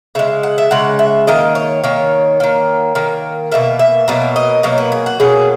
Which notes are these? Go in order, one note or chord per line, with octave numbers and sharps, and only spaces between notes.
C#3 G#3 E5
F#5
E5
C#3 G#3 F#5
E5
D#3 A#3 D#5
C#5
D#3 A#3 C#5
D#3 A#3
D#3 A#3
B2 F#3 A#3 E5
E5
B2 F#3 A#3
D#5
B2 F#3 A#3 C#5
B4
G#4
F#4
B2 F#3 A#3 G#4